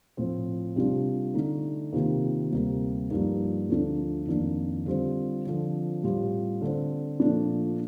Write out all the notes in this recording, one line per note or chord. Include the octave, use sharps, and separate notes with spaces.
A2 F3 C4
C3 G3 D4 F4
D3 A3 D#4
C3 D#3 A#3 F4
D2 C3 G3 A#3
G2 F3 A#3 D#4
D2 D3 F3 A3 D4
F2 D#3 A#3 D4
D3 G3 C4 F4
D3 F3 C4
A2 G3 C4 F4
D3 A3 C4
A#2 F3 A3 D4